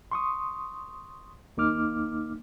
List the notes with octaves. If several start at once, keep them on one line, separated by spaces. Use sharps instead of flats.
C6 C#6 D#6
D#2 A#3 D#4 D6 F6